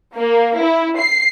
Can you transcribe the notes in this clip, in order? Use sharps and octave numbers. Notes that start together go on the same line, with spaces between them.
A#3
E4
C7